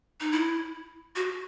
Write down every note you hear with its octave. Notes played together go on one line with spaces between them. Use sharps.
D#4
E4
F#4